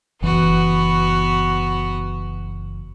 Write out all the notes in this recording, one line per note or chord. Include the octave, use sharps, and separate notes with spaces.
F#1 E3 B3 F#4